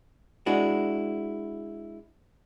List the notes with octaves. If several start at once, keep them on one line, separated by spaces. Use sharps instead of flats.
G#3 D4 E4 F#4